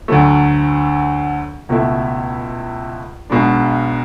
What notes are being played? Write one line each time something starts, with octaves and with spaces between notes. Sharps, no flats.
D2 D3 F#3 A3
C#2 B2 A3 E4
B1 B2 G#3 D4